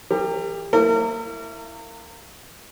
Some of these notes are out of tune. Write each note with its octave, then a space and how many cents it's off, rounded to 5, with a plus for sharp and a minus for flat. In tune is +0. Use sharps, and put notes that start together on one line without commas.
E3 +0 G4 +30 A#4 -30
A#3 -25 E4 +0 A#4 -35